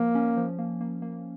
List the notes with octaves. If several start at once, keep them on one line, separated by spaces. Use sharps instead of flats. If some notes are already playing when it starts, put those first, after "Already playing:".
Already playing: F3 A#3
C#4
F3
A#3
A#3
A#3